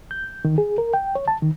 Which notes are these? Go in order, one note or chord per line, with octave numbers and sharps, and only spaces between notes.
G6
D#3
G#4
A#4
G5
C#5
A5
D#3